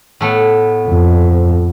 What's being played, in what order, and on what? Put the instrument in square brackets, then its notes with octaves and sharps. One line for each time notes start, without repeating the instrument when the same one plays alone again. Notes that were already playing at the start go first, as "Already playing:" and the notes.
[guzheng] A2 A3 B3
[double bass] F2